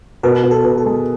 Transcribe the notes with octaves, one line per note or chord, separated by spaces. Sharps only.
B2 A#4
B2
A4
B2
A4
G#3